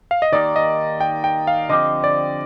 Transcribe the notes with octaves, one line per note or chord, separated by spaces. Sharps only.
F5
D#5
D#3 A#3 D#4 G4 D5
D#5
G5
G5
F5
D3 F3 C4 G4 D#5
D5